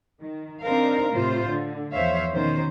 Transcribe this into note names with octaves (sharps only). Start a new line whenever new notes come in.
D#3
C4 D4 D#4 A#4 C5 F5
A2 C3 F4 C5
D3
E2 F3 C5 C#5 E5 F5
B2 D#3 C#4 C5